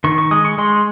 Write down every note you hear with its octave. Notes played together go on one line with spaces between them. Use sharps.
D#3 C#6
C#6
G#3 D#6
C#6
G#3 C6